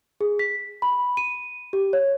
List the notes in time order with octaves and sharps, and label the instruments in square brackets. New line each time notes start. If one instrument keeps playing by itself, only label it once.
[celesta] G#4
B6
B5
D#7
G4
C#5